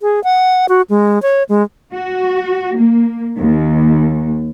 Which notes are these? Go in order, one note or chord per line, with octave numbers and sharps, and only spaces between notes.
G#4
F#5
F#4
G#3
C#5
G#3
F#4
A#3
D#2